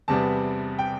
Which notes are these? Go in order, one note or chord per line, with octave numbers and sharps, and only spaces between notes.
E2 C3 G3 B3 A5
G5